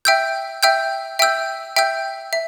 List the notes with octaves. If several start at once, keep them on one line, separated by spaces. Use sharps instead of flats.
E5 G5 E6 G6
E5 G5 E6 G6
E5 G5 E6 G6
E5 G5 E6 G6
E5